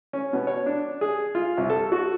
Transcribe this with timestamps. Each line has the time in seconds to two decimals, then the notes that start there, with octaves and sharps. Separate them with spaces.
0.13 C#4
0.33 B2
0.47 C#5
0.66 D4
1.01 G#4
1.35 F4
1.57 C2
1.70 A4
1.92 F#4